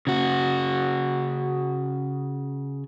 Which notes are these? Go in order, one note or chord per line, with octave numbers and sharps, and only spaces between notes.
C#3 F#4